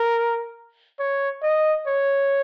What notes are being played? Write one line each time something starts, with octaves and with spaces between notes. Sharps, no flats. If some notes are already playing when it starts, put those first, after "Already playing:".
Already playing: A#4
C#5
D#5
C#5